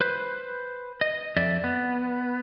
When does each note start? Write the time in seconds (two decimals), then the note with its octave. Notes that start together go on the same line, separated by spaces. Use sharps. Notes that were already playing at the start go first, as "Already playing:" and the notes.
0.01 B4 C5
1.01 D#5
1.36 F2 D5 E5
1.64 B3